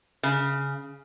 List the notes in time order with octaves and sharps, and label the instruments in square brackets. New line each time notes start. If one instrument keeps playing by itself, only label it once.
[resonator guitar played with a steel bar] C#3